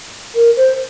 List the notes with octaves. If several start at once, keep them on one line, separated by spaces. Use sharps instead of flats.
A#4
C5